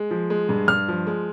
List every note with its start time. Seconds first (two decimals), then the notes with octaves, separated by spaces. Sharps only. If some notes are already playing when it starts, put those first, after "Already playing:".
Already playing: G#3
0.11 F3
0.30 G#3
0.49 G2
0.68 G2 F6
0.88 F3
1.07 G#3